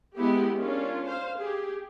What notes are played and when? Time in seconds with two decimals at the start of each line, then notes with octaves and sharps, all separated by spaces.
0.16 G#3 B3 E4 G4
0.58 C#4 D4 F4 A#4
1.06 C5 F5
1.38 G4 G#4